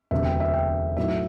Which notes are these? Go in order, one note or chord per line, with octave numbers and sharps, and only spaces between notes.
E1 D2 C3 F#3 E5
G5
E5
G5
B1 A2 F#3 E5